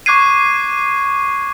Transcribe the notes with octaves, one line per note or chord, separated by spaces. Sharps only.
C#6 D6 F#6 G#6 C7 D#7